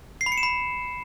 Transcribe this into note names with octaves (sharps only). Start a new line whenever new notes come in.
C7
B5
C#7
E7
B5